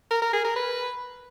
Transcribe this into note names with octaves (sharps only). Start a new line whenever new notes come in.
A#4
A#4
G#4
A#4
B4